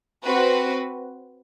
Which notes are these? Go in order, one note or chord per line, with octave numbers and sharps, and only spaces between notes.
C4 F#4 B4